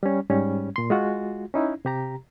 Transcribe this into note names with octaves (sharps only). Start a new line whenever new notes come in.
G3 C#4
G#2 G3 C#4
A#2 C6
G#3 F4 F#4
C#4 D#4 E4
C3 G4 A#5